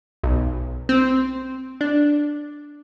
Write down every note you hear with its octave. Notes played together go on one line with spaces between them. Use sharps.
B1
C4
D4